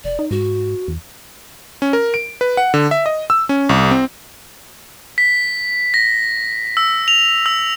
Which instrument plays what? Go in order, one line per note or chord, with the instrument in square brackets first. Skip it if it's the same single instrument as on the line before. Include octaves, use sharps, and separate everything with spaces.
[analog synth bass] F1 [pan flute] D5
[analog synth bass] D#4
[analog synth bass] G#2 [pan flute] F#4
[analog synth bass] E2
[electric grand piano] C#4
A#4
D7
B4
F#5
D3
E5
D#5
E6
C#4
C2
C4
[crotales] B6
A#6
E6
F7
E6